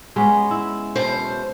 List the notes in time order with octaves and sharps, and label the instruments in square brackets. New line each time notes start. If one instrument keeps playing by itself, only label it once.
[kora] G#3 B3 C#4
E4
[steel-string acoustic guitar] F#2 B2 C5